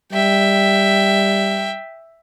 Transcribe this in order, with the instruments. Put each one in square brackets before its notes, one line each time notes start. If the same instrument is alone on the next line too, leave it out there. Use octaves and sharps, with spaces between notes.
[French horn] G3 [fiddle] E5 G5